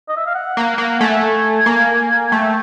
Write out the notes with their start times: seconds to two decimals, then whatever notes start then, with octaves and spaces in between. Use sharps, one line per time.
0.09 D#5
0.17 E5
0.26 F5
0.35 F#5
0.57 A#3
0.78 A#3
1.00 A3 G#5
1.66 A#3
2.31 A3 G5